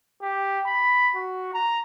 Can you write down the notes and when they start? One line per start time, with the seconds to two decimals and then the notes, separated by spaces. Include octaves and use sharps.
0.22 G4
0.66 B5
1.15 F#4
1.54 A#5